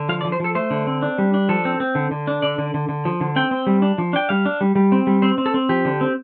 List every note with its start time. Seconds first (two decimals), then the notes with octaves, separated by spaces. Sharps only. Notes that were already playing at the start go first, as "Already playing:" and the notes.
Already playing: D3
0.09 F3 F5
0.21 D5
0.25 F3
0.32 C5
0.40 F3 A4
0.55 A3 C5
0.70 D3
0.87 C4
1.02 D4
1.18 G3
1.34 D4
1.49 F3 A4
1.65 C4
1.80 C4
1.95 D3
2.11 D3
2.27 D4
2.42 D3 D5
2.58 D3
2.74 D3
2.89 D3
3.05 F3
3.21 D3
3.36 C4 G5
3.51 C4
3.67 G3
3.82 D4
3.98 F3
4.13 D4 G5
4.29 G3 F5
4.45 D4
4.61 G3
4.75 G3
4.92 C4
5.07 G3
5.22 C4 C5
5.38 C4
5.46 A4
5.54 C4
5.69 F3 G4
5.85 D3
6.01 C4